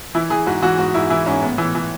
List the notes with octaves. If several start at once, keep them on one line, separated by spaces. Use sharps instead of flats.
E3 E4
E3 G#4
G#2 F#4
E3 F#4
G#2 F#4
G#2 E4
E3 E4
G#2 C#4
A2 B3
E3
E3